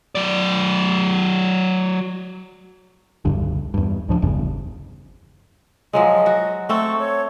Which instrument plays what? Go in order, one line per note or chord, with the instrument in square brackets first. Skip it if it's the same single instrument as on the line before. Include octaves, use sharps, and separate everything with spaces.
[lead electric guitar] F#3 D5
[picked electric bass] E1 C#2 G2 D3
E2 G2
C#2 A2 F3 D4
G1 E2 C#3
[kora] F3 F#3 G#3 [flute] D#5
[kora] F#4
[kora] A3 C4 A4 [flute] C#6
[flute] C#5